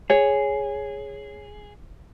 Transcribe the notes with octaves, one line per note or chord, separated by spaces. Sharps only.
G#4 C#5